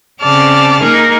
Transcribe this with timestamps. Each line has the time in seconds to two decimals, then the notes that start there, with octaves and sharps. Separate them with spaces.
0.21 C#3 C4 D5 A5 F6
0.82 A#3 D#4 G#4 A#4